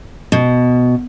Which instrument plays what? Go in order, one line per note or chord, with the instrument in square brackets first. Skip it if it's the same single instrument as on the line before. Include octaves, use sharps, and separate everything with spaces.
[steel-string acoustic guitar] B2